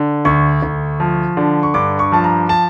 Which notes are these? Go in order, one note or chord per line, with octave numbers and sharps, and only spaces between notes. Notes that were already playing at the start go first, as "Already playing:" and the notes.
Already playing: D3
D2 C#6
D2
F3
D3
C#6
G2 D6
C#6
F3 A5
A#5
A5